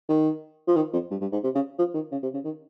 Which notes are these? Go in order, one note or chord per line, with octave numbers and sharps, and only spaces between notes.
D#3
F3
D#3
F2
G2
G2
G#2
C3
C#3
F3
D#3
C#3
C3
C#3
D#3